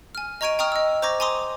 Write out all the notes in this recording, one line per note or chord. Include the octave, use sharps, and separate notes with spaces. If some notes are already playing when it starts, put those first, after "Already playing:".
G#5 F6
D#5 A#5 C#6 G#6 D7 D#7
G5 A#5 C#6 D#6 F6
D#5 E6
C5 A#5 C#6 D6 G#6 A#6
G#5 A#5 C6 D6 D#6